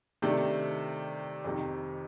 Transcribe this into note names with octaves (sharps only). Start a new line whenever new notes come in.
C3 D#3 A3 D4
F2 C3 D#3